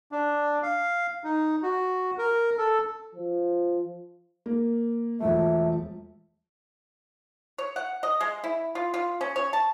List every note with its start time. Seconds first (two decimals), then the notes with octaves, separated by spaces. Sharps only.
0.12 D4
0.63 F5
1.24 D#4
1.62 F#4
2.18 A#4
2.58 A4
3.15 F3
4.46 A#3
5.20 E1 F3 A3 E5
7.58 C#5
7.76 F#5
8.03 D#5
8.21 G#3
8.44 E4
8.75 F4
8.94 F4
9.21 C#4
9.36 C#5
9.53 A5